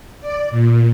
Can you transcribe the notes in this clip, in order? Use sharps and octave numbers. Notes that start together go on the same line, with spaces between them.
D5
A#2